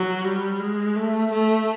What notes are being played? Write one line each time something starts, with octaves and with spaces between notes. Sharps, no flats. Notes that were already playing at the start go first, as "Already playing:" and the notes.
Already playing: F#3
G3
G#3
A3
A3